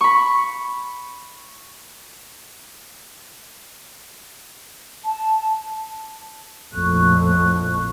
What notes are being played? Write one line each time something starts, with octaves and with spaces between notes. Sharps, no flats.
B5 C#6
A5
A#1 F2 A2 A4 C#6 F#6